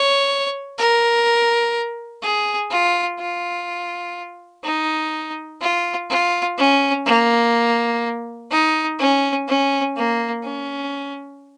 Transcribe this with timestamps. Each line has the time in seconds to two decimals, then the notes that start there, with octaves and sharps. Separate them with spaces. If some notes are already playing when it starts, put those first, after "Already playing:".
Already playing: C#5
0.78 A#4
2.22 G#4
2.71 F4
3.19 F4
4.64 D#4
5.61 F4
6.10 F4
6.58 C#4
7.06 A#3
8.51 D#4
9.00 C#4
9.48 C#4
9.96 A#3
10.44 C#4